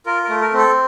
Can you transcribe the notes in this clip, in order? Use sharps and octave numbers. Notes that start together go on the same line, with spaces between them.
F4 A#4
A#4
A3
A#4
C4 A4